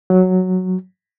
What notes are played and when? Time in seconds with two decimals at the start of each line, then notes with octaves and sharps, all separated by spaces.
0.10 F#3